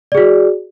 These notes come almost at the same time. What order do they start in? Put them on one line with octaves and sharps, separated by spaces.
D5 G#4 F#4